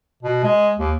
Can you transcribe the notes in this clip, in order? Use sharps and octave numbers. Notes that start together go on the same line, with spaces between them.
B2
G#3
D#2